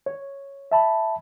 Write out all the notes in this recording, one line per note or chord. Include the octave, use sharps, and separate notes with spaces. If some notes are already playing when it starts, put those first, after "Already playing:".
C#5
E5 A5 B5